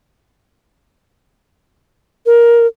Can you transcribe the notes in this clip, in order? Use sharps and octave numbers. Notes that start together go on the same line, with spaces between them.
A#4